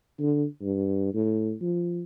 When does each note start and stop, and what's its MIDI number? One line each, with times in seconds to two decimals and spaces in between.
0.20 0.45 50
0.62 1.13 43
1.14 1.53 45
1.61 2.03 53